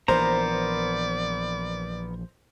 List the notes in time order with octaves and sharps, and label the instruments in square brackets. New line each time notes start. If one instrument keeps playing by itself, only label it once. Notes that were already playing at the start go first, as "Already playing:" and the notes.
[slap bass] A#1 E3 A#3 [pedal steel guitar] B3 A#4 A#5 [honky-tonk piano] C5 [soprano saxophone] D5